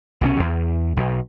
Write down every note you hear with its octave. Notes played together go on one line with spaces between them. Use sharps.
C2 B2 E3 C#4
E2
B1